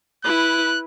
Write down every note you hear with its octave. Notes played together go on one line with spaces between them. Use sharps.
E4 B4 F#6